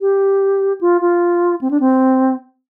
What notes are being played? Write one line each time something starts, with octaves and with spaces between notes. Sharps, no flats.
G4
F4
F4
C4
D4
C4